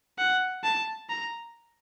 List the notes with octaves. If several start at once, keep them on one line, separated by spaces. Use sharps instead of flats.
F#5
A5
A#5